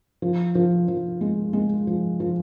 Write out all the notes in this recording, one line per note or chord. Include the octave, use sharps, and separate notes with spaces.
F3
F3
F3
G#3
G#3
F3
F3